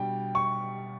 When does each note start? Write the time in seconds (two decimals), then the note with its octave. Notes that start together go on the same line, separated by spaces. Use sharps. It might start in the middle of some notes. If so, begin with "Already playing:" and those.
Already playing: B2 G3 D4 G5
0.35 C#6